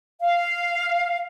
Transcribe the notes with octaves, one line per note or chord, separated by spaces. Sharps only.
F5